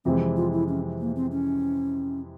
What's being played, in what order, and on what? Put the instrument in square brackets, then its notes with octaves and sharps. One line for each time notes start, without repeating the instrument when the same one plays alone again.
[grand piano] F2 C3 E3 G#3 [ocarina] C4
[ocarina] F4
E4
C#4
A#3
C4
C#4